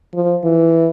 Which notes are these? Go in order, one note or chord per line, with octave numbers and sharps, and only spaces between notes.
F3
E3